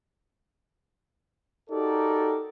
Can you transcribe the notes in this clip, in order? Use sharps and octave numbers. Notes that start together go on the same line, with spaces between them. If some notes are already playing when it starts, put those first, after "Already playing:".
D#4 F#4 G4 A4 A#4 D5